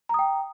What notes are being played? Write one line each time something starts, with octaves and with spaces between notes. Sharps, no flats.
G5 A#5 D#6